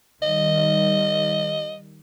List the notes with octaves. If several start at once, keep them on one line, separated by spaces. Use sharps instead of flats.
D#3 G3 D#5